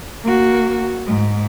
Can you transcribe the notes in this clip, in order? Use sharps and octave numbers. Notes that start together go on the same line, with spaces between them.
A#3 F#4
G#2